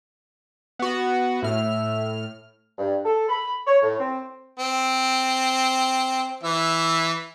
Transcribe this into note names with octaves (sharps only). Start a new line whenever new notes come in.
B3 F#4
A2 E5 F6
G2
A4
B5
C#5
A2
C4
C4
E3 E5